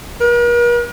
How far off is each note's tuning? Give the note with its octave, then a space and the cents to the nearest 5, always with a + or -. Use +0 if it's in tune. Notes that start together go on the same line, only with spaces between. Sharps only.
A#4 +45